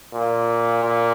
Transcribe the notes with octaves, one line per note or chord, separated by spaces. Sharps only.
A#2
A#2